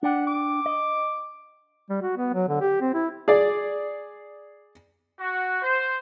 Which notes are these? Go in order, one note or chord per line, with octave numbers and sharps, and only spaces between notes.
D4 D5 F#5 G5
D6
D#5
G3
F#4
B3
F#3
D3
G4
C4
E4
G#4 D5
F#4
C5